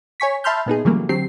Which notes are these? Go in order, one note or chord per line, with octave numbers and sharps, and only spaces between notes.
C#5 G#5 C#6 B6
E5 A5 B5 C6 F6 G6
A#2 B3 D#4 G#4
C#3 E3 F#3 G3 A3 A#3
D3 F#3 C4 G4 C7